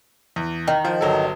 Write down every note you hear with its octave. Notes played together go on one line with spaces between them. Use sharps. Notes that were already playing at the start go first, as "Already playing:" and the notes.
E2
D#3
F3
G1 F#3 A4